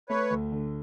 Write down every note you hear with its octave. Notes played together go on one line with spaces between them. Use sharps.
A3 B4 C#5
D2
D3